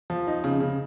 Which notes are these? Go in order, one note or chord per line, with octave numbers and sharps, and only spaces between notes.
F3
D#4
C#3
C#3